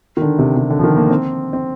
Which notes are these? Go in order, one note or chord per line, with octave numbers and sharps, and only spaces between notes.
D#3
D3
C3
C3
D3
F3
D#3
A#3
C4
C4